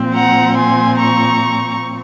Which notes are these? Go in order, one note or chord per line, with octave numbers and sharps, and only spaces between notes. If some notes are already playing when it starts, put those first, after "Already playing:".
Already playing: A#2 F3 C4
F#5 A#5
G#5 C6
A#5 C#6